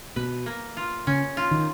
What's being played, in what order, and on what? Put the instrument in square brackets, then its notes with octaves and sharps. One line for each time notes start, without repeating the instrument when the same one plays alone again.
[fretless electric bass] B2 [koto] B4
[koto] A#3
F4
[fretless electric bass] C#3 [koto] C#4
[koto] F4
[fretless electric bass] D#3